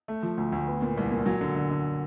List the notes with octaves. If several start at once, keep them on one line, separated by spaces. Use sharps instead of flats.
A3
F3
D2
D2
B3
A#2
C2
A#2
F#3
D3
D3
D3